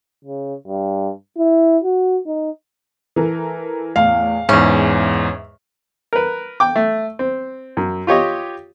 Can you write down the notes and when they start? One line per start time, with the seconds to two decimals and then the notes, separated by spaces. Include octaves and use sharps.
0.25 C#3
0.67 G2
1.38 E4
1.84 F#4
2.27 D#4
3.16 E3 A4 A#4
3.96 E2 A2 F5
4.49 E2 G#2 C#4 E5
6.13 A#4 B4
6.60 G5 D6
6.76 A3
7.19 C4
7.77 F#2
8.07 F4 G4 C#5 D#5